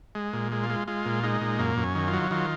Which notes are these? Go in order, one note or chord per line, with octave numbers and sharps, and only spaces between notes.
G#3
A#2
G#3
F4
G#3
G#3 F4
A#2
G#3 D#4
A#2
F#2 A#3
F#2
C#4
D#3
F4
F#3
D#3 F4